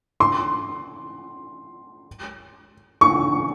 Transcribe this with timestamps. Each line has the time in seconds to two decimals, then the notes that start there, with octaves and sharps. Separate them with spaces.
0.20 C6
3.01 C#6